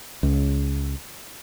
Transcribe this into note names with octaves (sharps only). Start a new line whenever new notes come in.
C#2